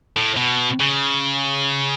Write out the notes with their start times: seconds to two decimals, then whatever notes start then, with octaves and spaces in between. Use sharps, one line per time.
0.16 A2
0.37 B2
0.81 C#3